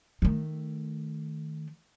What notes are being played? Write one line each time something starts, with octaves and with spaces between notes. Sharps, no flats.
D#3 A3